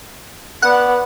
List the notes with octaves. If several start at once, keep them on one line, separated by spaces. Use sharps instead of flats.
B3 D5 F#5